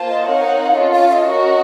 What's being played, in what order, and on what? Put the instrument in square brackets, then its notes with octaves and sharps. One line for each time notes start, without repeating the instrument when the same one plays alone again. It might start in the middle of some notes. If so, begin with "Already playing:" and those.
Already playing: [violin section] A#3 F4 C5 A5
[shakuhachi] D#5
[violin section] C4 D#4 A#4 C#5 F#5 [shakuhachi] F5
[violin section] C#4 F4 A4 [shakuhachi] D#5
[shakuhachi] F5
F5
D#5
[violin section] C#4 F#4 A#4